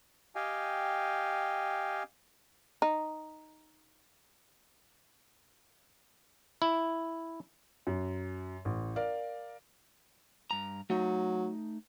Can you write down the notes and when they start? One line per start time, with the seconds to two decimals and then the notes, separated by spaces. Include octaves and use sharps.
0.35 G4 D#5 F5 G5 G#5
2.82 D#4
6.62 E4
7.87 F#2
8.65 A1
8.96 A#4 D5 F5
10.51 G2 A#5
10.90 F#3 A3 D#4